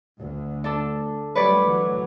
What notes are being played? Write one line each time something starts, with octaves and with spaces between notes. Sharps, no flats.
D2
D4 A4
F#3 G3 A3 B4 C#5 D5
D2 E3 F#3